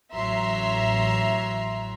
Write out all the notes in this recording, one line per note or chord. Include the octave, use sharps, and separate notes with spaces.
A1 F#3 E5 A#5 C6